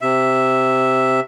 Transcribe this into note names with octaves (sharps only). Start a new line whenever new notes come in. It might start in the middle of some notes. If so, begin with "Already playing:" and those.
C3 E5